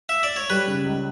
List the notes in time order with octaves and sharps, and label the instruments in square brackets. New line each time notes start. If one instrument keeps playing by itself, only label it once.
[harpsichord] E5
D5
C#5
[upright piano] G3 [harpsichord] B4
[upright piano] C#3
C#2